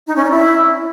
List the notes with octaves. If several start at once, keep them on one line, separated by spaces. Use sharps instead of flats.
D#4
C#4
D5
E4